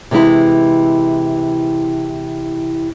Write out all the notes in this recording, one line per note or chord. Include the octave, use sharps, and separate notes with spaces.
C3 E3 G#3 E4